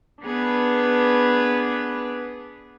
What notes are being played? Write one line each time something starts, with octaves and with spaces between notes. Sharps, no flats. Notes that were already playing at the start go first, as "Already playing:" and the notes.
B3 D4 G#4 B4